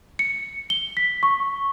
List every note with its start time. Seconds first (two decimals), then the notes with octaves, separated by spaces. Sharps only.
0.19 C#7
0.70 G7
0.97 B6
1.23 C#6